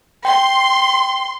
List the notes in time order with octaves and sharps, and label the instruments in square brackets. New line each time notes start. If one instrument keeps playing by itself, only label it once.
[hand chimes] G5 [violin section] C6